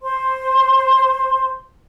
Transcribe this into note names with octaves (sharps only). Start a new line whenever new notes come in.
C5 C6